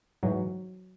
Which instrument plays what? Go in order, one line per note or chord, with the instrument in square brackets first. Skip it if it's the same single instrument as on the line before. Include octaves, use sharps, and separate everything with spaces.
[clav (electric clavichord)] G#2 E3 F#3